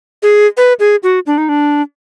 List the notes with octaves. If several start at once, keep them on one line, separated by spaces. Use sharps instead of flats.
G#4
B4
G#4
F#4
D4
D#4
D4